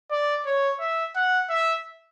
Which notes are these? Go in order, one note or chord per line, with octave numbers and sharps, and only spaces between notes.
D5
C#5
E5
F#5
E5